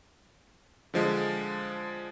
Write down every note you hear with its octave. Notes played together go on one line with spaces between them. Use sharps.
D3 F3 G#3